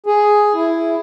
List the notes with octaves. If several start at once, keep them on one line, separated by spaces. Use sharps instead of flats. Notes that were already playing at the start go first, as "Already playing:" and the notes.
G#4
E4